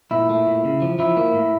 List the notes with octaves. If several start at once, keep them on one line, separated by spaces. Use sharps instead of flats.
A#2 E4
A3
A#2
C#3
F3
F3 E4
A#3
A2